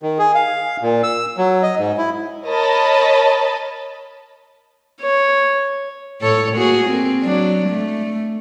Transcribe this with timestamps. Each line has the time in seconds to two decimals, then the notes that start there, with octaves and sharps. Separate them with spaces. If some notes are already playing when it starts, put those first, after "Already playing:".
0.03 D#3
0.19 G#4
0.35 F5
0.82 A#2
1.03 E6
1.38 F#3
1.63 D#5
1.78 G#2
1.98 E4
2.45 A#4 C#5 D#5 A5 B5
5.01 C#5
6.21 A2 A4 C#5
6.56 A#3 F#4 G#4
6.86 A#3 C4
7.23 F#3 D4
7.69 A3